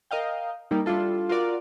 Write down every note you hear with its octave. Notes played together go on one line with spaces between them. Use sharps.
A#4 D#5 F5 G5
G3 A#3 D#4
G3 D4 E4 F4 A4
F4 F#4 A#4 D5 F5